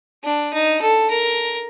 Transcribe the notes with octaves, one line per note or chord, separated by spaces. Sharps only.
D4
D#4
A4
A#4